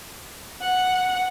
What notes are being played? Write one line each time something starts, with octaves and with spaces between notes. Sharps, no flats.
F#5